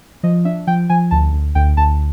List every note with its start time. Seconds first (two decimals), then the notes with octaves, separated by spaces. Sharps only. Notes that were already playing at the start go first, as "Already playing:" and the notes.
0.23 F3 D#5
0.45 D4 E5
0.67 F3 G5
0.90 F3 G#5
1.11 D2 A5
1.33 D2
1.55 D2 G5
1.77 D2 A5